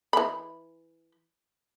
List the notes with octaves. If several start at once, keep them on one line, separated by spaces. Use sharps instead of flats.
E3 B5